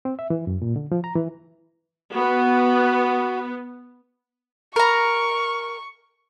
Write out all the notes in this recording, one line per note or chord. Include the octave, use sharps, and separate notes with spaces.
C4
E5
E3
F#2
A#2
D3
F3
A#5
E3
B3 F#4
A#4 A#5 C#6